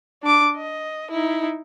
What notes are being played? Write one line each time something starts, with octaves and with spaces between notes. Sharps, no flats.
D4 D6
D#5
D#4 E4